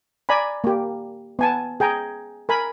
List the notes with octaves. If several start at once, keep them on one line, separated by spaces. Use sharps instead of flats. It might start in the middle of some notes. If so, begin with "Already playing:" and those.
D5 G#5 A#5 B5
A#3 G4
B3 G#5 A5
G#4 G5 G#5 A#5
A#4 G#5 B5